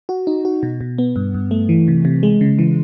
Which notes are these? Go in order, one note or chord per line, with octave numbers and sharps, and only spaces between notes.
F#4
D#4
F#4
B2
B2
B3
G2
G2
A3
E3
C3
C3
G#3
C#3
E3